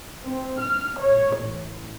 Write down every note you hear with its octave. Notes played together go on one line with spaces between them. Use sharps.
C4
F6
C#5
A1